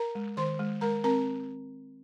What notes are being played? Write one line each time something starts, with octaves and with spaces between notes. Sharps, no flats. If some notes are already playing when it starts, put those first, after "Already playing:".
Already playing: A#4 A#5
G#3
D#3 C5 C6
G#3
G#3 A#4 A#5
C4 A#4 A#5